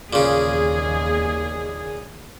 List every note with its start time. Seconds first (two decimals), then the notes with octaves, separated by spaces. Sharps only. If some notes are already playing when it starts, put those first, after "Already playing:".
0.13 D#2 A#2 C#3 G#4